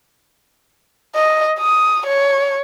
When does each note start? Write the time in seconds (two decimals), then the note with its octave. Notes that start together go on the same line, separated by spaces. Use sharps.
1.15 D#5
1.59 D#6
2.07 C#5